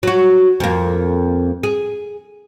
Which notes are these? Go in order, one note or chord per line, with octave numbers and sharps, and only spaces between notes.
F#3 F#4
F2 A#3
G#4